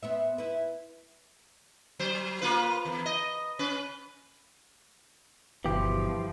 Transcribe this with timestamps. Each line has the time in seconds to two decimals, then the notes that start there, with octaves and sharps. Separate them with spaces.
0.03 B3 C5 E5
0.38 E4 B4
1.99 F#3 C5
2.41 A#3 F4 B4
2.85 E2
3.06 D#5
3.59 C#4 B4
5.65 G1 G2 B2 E3 F3 G4